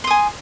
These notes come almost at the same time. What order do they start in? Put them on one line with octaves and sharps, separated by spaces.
C6 D#6 G#5